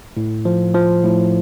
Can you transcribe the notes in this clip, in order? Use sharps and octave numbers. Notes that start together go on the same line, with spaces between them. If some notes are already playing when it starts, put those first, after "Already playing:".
A2
F3
F3
A2